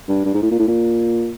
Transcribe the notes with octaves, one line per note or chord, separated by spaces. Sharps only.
G2
G2
G#2
A2
A#2
A2
A#2